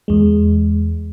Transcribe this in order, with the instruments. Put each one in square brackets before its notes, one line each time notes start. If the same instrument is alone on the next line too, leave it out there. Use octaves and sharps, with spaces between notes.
[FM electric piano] E2 G#3